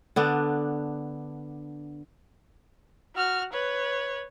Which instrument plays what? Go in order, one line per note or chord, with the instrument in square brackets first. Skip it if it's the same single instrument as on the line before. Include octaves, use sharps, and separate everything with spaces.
[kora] D3 B3 D4
[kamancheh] F#4 F6
B4 C#5